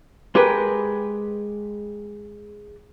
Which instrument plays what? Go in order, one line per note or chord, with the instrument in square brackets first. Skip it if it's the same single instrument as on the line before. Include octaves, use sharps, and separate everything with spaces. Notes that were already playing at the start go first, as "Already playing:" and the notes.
[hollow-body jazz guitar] G#3 G4 A#4 B4